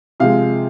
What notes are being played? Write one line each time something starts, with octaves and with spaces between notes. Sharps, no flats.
C3 F3 G#3 F5